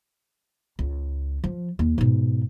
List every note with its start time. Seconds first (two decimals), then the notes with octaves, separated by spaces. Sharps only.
0.79 C#2
1.44 F3
1.79 D#2
1.98 G#2 B2